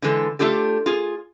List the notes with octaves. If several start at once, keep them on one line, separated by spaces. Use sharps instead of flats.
D3 E3 G#3 A4
A3 D4 F4 G4 A4
F4 G#4